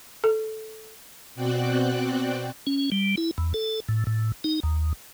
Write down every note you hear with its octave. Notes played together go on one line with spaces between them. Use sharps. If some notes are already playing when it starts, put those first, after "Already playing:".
A4
B2 C4 F#4 D5 G5 F#6
C#4
G3
E4
E2
A4
A2
A2
D#4
D#2